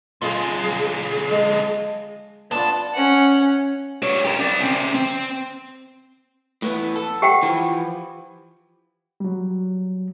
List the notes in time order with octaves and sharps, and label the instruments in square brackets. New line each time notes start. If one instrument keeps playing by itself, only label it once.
[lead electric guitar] D3 G#4 [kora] F4 F5
[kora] G#3 F5
[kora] B3 D4 F4 [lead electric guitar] B4 A5
[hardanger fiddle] C#4 F#5
[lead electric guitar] G3 C#5
G4 A#4
C4 D5
C#3 C4
C4
[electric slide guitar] A2 E3 B3
A4
[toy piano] G4 F#5 G5
[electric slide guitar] E3 F3
[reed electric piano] F#3 G3